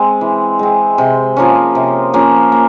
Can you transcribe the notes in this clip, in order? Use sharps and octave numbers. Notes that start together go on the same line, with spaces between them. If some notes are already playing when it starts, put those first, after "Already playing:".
Already playing: G#3 C4
E3
G#3 C4
C3
F3 A#3 C#4
C3
F3 A#3 C#4
A#3